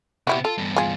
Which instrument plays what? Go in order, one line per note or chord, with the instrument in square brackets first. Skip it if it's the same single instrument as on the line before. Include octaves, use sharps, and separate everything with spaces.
[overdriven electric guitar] C3 B3 [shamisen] G3 E4 F#4
[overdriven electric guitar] F4 [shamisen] A4
[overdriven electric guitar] E2 G2
[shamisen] F4 G#4